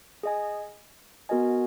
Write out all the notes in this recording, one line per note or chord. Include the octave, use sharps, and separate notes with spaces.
G#4 D#5 G#5
B3 F#4 A#4 D#5 G#5